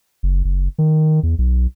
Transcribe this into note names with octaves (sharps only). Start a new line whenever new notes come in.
F#1
F#1
D#3
E2
B1